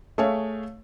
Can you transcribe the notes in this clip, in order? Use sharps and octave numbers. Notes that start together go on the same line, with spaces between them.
A3 G#4 C#5 E5 F5